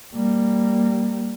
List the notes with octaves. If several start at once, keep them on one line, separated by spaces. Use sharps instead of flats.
G3 A#3